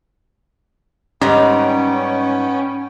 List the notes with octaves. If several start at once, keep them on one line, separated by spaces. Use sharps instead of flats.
G#2 G3 B3 C#4 D#4 G5